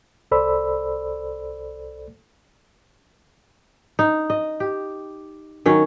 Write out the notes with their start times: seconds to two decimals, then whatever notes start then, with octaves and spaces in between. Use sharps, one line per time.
0.31 C2 A4 C5 D5 B5 E6
3.99 D#4
4.30 D#5
4.60 G4
5.66 D#3 F#3 C#4